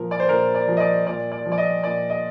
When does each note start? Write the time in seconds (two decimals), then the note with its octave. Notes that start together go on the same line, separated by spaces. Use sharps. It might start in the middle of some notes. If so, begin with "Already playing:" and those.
Already playing: A#2 F3 A#4
0.11 D5
0.20 C5
0.29 A#2 A#4
0.55 D5
0.68 F3
0.77 D#5
0.80 D5
1.06 A#2 D5
1.32 D5
1.45 F3
1.52 D5
1.58 D#5
1.83 A#2 D5
2.10 D#5